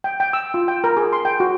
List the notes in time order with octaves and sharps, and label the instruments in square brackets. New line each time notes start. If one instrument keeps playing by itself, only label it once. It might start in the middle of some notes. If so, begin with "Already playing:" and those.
[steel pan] G5
G5
E6
F4
G5
A#4
G#4
C6
G5
F#4